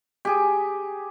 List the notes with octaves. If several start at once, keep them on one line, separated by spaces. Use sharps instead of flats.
G4 G#4